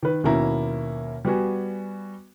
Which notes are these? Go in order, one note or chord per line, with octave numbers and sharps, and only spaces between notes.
D#3 B4
D#2 B2 A#3 C#4 E4 A#5
G3 B3 F#4 G#5